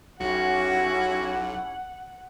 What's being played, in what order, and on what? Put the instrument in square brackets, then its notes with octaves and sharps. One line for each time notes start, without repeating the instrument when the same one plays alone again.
[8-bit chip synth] B1 [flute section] C#4 E4 G4 [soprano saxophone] F#4 [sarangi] F#5